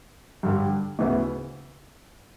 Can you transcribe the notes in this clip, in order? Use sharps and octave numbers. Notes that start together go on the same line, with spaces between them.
G2 D3 G3
D2 C#3 E3 B3 E4